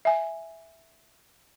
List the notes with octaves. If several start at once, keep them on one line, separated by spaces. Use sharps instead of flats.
E5 G#5